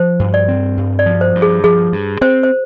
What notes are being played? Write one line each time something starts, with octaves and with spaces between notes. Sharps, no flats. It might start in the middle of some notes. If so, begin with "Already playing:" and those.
Already playing: F3 C5
G2
D5
C4
G2
D5
F3
C5
G2
G#4
F3 G#4
G2
C4 C5
C5